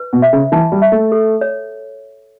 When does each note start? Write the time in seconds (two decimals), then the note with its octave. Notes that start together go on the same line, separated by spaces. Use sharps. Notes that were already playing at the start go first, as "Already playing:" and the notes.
Already playing: B4
0.13 B2
0.22 E5
0.33 C#3
0.52 E3 A5
0.72 G3
0.82 E5
0.92 A3
1.12 A4
1.41 C#5